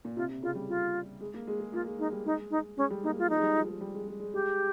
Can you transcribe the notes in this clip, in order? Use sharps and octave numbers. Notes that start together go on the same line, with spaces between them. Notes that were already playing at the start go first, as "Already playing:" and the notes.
A#2
C3 F4
C3
C#3 F4
G3
F4
G#3
A#3
G#3
G#3
A#3 F4
G#3
G#3 D#4
G3
G#3 D#4
D#4
G#3 C#4
G3
A#3 D#4
G#3
F4
F3 D#4
G#3
G3
F3
G#3
G3
G#3
G#3
G#3
G#3 G4